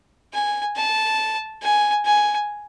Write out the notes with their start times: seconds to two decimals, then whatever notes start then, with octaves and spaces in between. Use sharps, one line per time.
0.33 G#5
0.76 A5
1.62 G#5
2.05 G#5